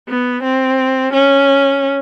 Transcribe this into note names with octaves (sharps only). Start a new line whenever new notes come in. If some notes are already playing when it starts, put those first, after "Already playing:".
B3
C4
C#4